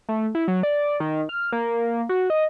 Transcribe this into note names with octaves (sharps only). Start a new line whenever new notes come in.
A3
E4
F#3
D5
D#3
F6
A#3
F#4
D#5